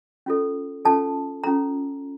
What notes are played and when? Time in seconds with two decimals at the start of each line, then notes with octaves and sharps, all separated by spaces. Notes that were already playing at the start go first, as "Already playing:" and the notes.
0.26 C#4 F4 A4
0.85 C#4 F4 A4 A5
1.44 C#4 F4 A4 A#5